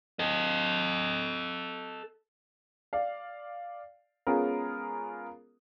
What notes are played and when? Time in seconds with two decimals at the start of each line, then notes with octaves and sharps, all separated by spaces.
0.19 A4 D#5
2.93 D5 F5
4.27 G#3 B3 C#4 F4 G#4 A#4